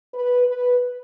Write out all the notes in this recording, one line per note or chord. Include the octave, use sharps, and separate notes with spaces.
B4
B4